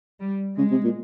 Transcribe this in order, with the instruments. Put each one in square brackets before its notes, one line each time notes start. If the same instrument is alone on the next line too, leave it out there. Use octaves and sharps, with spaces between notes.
[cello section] G3
[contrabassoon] C#3 [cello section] G#3
[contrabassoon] C3
A#2